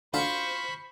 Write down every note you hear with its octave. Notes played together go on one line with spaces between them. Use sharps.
D4 F4 F#4 A4 C5 B5 C#6